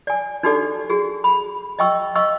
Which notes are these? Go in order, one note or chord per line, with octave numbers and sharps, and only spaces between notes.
D5 G#5
D4 D#4 F#4 G4 A4 D5
F#4 G#4
B5
D#5 E5 G5 C#6 E6
D#5 F5 C#6 E6